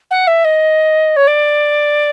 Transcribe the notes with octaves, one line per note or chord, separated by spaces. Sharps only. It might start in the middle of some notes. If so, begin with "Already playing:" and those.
F#5
E5
D#5
C#5
D5